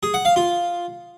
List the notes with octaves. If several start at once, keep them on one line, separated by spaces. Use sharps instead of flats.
G#4
F#5
F5
F4